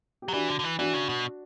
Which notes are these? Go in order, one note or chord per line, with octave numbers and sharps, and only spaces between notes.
G4
F#3
E3 D4 F#4
D3
D3
E3
E3 D4 F#4
C#3
B2